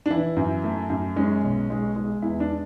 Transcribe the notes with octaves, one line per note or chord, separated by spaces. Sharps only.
D4
E3 E4
F#2
A3
F#2
G#3 C#4
B1
G#3
G#3
E2 E4
D4